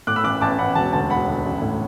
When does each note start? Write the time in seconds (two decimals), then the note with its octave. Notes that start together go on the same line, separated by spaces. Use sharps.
0.07 A2 D6 F#6
0.16 B5 E6
0.24 A1 D6 F#6
0.41 A1 A5 D6
0.58 A1 F#5 B5
0.75 E1 A5
0.93 D2 A5
1.10 E1 F#5 B5
1.27 D2
1.45 A1
1.62 A2